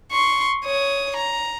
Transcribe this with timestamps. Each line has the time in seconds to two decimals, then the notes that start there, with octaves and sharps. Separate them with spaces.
0.11 C6 C#6
0.65 C#5 D#6
1.16 A#5